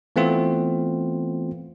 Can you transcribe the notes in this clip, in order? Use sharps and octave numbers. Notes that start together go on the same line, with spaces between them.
E3 A3 B3 C4 F4